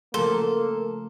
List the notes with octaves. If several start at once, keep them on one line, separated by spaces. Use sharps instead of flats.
C#3 F3 A3 A#3 A4 C6